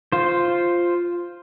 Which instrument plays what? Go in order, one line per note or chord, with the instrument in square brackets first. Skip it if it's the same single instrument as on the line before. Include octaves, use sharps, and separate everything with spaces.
[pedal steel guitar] F4 C5